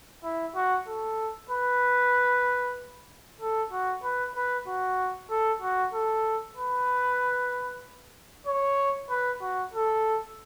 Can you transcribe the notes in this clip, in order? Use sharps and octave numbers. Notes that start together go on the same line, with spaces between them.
E4
F#4
A4
B4
A4
F#4
B4
B4
F#4
A4
F#4
A4
B4
C#5
B4
F#4
A4